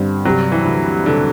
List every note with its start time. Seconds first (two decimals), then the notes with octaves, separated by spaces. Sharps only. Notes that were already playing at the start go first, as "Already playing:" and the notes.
Already playing: G2 D3 C4
0.25 C3 F#3
0.52 E3
0.65 D2
1.06 E1 D3